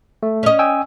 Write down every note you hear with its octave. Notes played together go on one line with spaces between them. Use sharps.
A3
C#4 D#5
G5 G#5 E6